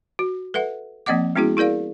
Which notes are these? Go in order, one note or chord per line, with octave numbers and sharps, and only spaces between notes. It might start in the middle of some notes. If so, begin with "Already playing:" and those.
F#4
A4 B4 E5 F#5
F3 A#3 C4 D#5 F#5 D6
G#3 B3 C#4 E4 F#4 G#4
E4 G#4 A#4 D5 F5